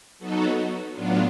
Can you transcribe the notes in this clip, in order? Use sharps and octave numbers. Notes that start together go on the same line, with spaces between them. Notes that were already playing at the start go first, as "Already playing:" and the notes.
F#3 B3 D#4 F#4 A4
A2 F#3 B3 D4 F4